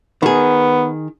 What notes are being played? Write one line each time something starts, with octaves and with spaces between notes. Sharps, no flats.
D#3 B3 G#4